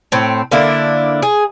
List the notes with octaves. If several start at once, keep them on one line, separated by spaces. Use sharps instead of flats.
A2 C4
D3 A#3 D4 E4
G#4